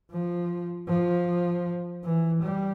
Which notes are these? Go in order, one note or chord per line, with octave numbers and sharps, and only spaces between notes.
F3
F3
E3
G3